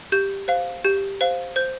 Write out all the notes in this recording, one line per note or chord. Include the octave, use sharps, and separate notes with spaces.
G4 G6
C5 F5
G4 G6
C5 F5
C5 G6